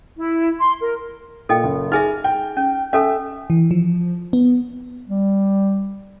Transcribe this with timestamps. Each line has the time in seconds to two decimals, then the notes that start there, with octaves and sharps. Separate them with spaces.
0.17 E4
0.60 C6
0.81 A#4
1.49 A#2 A4 D#5 G5
1.64 F#1
1.92 D#4 G#4 E5 G#5 F6
2.24 G5
2.57 C#4
2.93 C#4 A4 E5 G#5
3.50 E3
3.71 F3
4.33 B3
5.08 G3